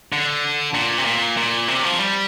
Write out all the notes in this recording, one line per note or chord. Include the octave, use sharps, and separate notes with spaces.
D3
A#2
C3
A#2
A#2
C3
F3
G3